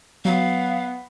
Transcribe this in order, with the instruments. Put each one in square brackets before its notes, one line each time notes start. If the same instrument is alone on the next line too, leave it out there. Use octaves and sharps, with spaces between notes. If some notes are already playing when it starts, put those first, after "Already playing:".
[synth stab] F#3 [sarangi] B3 [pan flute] F5